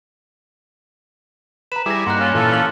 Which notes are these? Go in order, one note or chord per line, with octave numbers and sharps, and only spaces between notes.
B4 A#5 E7
G3 E4 G#4 D6 A#6
G2 A#3 D#4 F#5 C6 F#6
C#4 F4
A#2 E3 F4 A4
F6 F#7